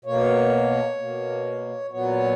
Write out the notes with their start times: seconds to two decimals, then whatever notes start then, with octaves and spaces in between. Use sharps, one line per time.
0.05 B2 A#3 C#5
0.98 B2 A#3
1.90 A#2 F#3 B3 C#5